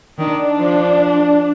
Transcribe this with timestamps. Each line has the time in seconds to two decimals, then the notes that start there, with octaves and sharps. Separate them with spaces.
0.19 D#3 D4
0.58 F3